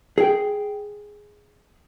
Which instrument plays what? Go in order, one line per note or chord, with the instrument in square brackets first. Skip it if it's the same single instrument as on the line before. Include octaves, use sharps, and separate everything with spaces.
[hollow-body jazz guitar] G#4 G5